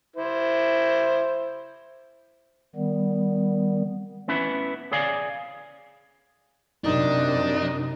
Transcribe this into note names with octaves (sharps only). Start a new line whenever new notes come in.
E4 C5
D#3 G3 B3
B3 C#4 E4 B4
G#4 C#5 D5 F5 G#5
F#2 C3 D4 D#4